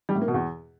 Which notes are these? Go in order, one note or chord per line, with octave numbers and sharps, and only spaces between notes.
G3
A2
A#3
B2
E2